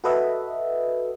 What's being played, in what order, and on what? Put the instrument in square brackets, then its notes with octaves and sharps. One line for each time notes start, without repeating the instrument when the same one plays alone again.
[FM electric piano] F#4 A4 B4 D#5 E5